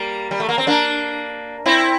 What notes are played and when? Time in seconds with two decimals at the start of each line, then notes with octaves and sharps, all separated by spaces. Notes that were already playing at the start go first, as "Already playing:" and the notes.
Already playing: G3 A#3
0.31 G3
0.40 A3
0.49 A#3
0.58 C4
0.67 A#3 D4
1.66 C4 E4